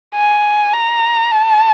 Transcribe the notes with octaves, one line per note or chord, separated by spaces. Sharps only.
G#5
A#5
A5